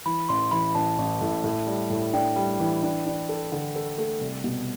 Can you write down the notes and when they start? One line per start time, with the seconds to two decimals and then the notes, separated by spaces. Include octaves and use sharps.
0.06 E3 B5
0.29 A1 C6
0.51 E3 B5
0.75 A1 A5
0.98 A1
1.21 A2
1.44 A2
1.67 G3
1.90 A2
2.13 D4 G5
2.36 G3
2.60 E3
2.83 D4
3.06 D4
3.29 A4
3.52 D3
3.76 A4
3.98 A3
4.21 C2
4.44 B2